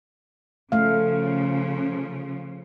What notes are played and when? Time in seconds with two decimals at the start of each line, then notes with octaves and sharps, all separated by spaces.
0.72 C#3 F3 A3 F5